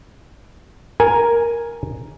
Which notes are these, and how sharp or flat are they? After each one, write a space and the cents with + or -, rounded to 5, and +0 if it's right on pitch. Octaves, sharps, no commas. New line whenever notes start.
A#4 +5 G#5 +0